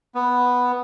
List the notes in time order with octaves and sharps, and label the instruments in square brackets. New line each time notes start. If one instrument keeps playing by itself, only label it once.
[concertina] B3